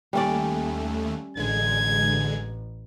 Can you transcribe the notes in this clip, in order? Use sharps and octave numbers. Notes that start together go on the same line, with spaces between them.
D#2 G3 A3 C#4 D5
A1 D3 G#3 G#6